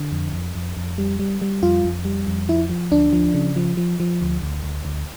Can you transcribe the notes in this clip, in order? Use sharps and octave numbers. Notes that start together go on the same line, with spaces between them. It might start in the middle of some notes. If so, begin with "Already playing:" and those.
Already playing: D3
F2
F2
F2
F2
G3
G3
G3
F2 F4
F2
G3
F2
F3 E4
F3
D2 D4
F3
C#3
F3
F3
F3
D2
D2
D2
D2